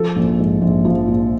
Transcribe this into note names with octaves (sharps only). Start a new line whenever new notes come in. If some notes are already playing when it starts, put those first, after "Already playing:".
Already playing: F3 A4
A#1
G#2
A#1
F3
A#1